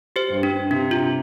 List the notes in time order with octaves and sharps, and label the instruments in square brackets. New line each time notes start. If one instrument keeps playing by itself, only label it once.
[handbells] G4 C5
[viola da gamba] G2
[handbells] D4
[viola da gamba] C3 [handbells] D4
[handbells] F4